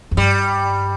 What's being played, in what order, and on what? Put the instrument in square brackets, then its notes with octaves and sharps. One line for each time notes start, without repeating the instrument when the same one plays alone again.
[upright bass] F2
[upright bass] G2 [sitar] G3